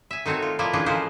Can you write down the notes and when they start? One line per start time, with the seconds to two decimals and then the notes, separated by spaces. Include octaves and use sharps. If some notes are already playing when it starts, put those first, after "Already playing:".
0.11 E5 G#5
0.26 D#3 A3 C4 F#4 C#5
0.42 F4
0.59 F3 A#3 E4 F4 D5
0.73 A2 E3 C#4 D4 F4 G#4
0.86 C#3 F3 G#3 A#3 B4 C5